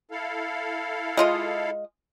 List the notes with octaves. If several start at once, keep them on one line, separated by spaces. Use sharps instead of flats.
E4 A4 F5
G#3 F4 D#5